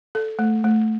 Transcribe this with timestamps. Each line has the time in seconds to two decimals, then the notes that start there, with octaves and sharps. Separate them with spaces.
0.15 A4
0.39 A3
0.64 A3